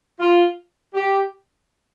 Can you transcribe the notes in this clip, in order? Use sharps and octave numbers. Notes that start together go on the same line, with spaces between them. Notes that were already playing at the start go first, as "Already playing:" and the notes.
F4
G4